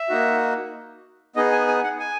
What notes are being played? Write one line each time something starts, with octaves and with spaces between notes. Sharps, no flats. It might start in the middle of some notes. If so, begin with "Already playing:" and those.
Already playing: E5
A#3 D#4 F#4
B3 D#4 G#4 D#5
G#5
G#5
F#5
G#5